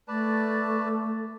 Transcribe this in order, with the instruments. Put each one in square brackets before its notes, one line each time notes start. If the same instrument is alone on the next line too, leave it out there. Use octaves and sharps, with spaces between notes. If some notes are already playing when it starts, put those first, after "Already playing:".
[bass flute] A3 [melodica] B4 D5 A5